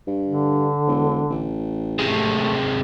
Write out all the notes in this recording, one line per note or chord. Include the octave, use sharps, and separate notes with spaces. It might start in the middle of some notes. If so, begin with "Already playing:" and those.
G2
D3
E1
A1
C3 G#3 A3